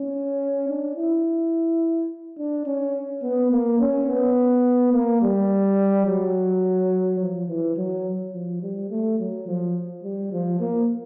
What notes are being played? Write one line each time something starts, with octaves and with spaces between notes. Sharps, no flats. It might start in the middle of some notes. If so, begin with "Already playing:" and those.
Already playing: C#4
D4
E4
D4
C#4
B3
A#3
C#4
B3
A#3
G3
F#3
F3
E3
F#3
F3
G3
A3
F#3
F3
G3
F3
A#3